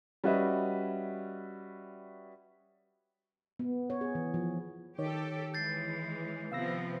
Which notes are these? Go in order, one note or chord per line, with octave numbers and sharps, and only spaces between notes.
G3 C#4 F#4 B4 D#5 E5
B3
C#5
G#4
E3
F3
D#3 G4 A4 C#5
E3 G#3 G6 A6 C7
C3 F3 B3 F5 E6 A#6